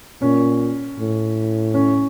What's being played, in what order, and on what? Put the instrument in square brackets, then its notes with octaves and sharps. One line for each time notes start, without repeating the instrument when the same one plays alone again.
[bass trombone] A#2 [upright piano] C#4
[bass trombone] A2
[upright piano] C#4